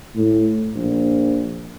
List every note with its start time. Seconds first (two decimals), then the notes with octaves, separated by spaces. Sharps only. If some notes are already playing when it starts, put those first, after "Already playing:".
0.16 A2
0.75 A#1